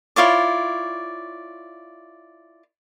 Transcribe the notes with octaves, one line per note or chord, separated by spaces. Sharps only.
E4 F4 C#5 D5